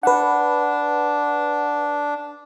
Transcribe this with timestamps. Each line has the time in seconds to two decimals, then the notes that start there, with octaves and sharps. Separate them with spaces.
0.03 D4 B4 F#5